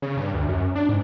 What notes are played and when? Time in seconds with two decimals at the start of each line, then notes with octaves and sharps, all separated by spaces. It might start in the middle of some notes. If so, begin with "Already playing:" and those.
0.02 C#3
0.17 G2
0.34 D2
0.49 F#2
0.75 D4
0.89 G#2